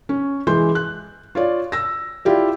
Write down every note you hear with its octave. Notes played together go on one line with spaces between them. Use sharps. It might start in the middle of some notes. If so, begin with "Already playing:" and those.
C#4
E3 G#3 C6 G6
F#6
F4 C#5 D5
E6 A#6
E4 F4 G4 D5